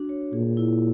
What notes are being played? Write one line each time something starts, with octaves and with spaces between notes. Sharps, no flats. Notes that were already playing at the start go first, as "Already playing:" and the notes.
Already playing: D4 F#4
C#5
A#2 G#4
E4